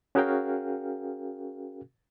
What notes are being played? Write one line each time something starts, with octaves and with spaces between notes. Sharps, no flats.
C#4 F#4 G#4 A#4 F5 G5